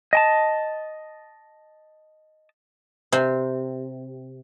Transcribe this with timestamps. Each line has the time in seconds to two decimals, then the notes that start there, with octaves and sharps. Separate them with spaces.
0.13 D#5 G#5 A5
3.12 C3